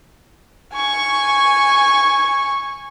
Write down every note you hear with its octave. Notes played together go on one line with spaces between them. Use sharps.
G#5 C#6